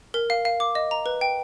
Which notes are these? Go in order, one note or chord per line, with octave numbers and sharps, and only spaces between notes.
A#4
F5
F5
D6
D#5
A#5
B4
G5